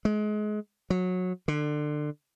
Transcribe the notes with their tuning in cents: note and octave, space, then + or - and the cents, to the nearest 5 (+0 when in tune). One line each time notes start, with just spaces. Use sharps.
G#3 +30
F#3 -20
D3 +25